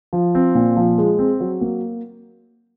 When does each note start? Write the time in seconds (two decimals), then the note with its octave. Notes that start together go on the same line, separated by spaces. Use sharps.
0.13 F3
0.35 C4
0.55 A#2
0.77 F3
0.98 G#3
1.19 C4
1.40 F#3
1.61 A#3